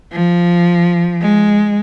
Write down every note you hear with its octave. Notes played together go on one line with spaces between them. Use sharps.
F3
G#3